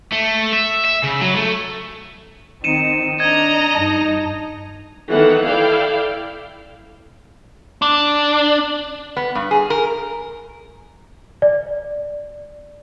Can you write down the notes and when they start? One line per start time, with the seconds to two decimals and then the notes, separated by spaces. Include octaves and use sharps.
0.12 A3
0.53 E5
0.85 E5
1.04 C#3
1.21 F#3
1.36 A3
2.64 D#3 C4 D#4 C#7 D#7 E7
3.20 D4 D#5 A#5 G#6
3.75 G2 D#4 A5
5.10 D#3 E3 B3 A4 F#5
5.46 E4 A4 D5 F5 G5
7.82 D4
9.17 B3
9.35 G2
9.51 G#4
9.70 A#4
11.42 D5